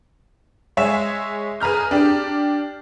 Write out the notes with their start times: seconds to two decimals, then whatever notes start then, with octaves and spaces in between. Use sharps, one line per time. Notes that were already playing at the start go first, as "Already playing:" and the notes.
0.77 G#3 C#5 E5 G#5 E7
1.60 G#4 B4 A#5 F6 G6
1.91 D4 G4